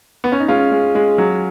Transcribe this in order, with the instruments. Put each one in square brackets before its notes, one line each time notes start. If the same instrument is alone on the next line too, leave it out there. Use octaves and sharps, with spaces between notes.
[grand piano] B3
C#4
D#4
G#3 C#4 F4
G#3
G#3
F#3